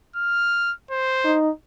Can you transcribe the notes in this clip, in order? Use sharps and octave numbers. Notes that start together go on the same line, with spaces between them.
F6
C5
D#4